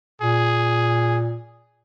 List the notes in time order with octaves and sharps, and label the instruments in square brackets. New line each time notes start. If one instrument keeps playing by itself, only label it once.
[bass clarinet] A#2 [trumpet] G#4